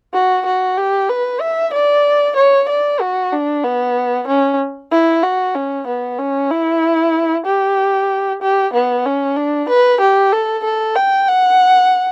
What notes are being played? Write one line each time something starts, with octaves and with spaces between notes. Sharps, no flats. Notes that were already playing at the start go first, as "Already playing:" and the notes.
F#4
F#4
G4
B4
E5
D5
C#5
D5
F#4
D4
B3
C#4
E4
F#4
C#4
B3
C#4
E4
G4
G4
B3
C#4
D4
B4
G4
A4
A4
G5
F#5